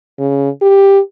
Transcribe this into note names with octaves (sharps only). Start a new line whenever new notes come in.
C#3
G4